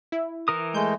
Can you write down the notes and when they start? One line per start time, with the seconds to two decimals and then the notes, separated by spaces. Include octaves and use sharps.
0.12 E4
0.48 E3 A#4 D#6
0.74 G#3 A3 G6